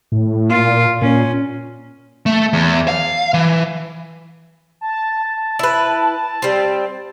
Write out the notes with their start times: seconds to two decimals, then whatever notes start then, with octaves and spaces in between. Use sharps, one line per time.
0.12 A2
0.50 A#2 F4
1.02 A#2 C#4
2.26 A3
2.53 E2
2.88 F5
3.34 E3
4.81 A5
5.59 E4 B4
6.42 G3 C4